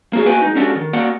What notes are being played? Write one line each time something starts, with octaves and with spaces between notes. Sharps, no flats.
A#3 F#4 G#4
A#3 F#4 B4 G5 G#5
G#3 D#4
G#3 C#4 D4 F#4 G4 A4
D#3
A#3 F#4 D5 F#5